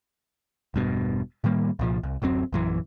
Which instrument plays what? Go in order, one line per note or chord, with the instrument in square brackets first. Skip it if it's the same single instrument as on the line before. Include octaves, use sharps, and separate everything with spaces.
[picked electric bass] E1 G2 B2
A2 D#3 G3 A#3
C2 A#2 F3
C2
D1 F#2 F#3 C4
A#1 F#2 E3